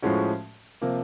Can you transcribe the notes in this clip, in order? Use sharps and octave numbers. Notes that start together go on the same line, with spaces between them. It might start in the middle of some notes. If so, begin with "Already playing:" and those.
A2 F3 G#3 C#4 F#4
C3 F3 A#3